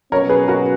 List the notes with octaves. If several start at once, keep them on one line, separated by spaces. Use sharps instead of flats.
B2 F#3 C#4 A#4 C#5
G#4 B4
F#4 A#4